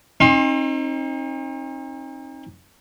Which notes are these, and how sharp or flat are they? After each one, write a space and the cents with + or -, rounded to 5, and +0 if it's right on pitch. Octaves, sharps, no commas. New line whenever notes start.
C4 +45 D#4 +0 C6 +25